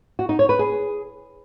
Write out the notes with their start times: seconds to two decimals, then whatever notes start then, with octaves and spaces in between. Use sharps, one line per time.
0.19 F#4
0.29 D#4
0.39 C#5
0.49 B4
0.59 G#4